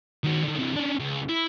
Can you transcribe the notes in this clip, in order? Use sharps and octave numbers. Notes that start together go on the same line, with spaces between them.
D#3 F#4
D3 D#3
C3 E3
C#4 D4
C#2
E4